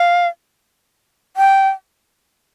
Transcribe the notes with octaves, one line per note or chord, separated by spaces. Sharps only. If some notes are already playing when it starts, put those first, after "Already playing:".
Already playing: F5
G5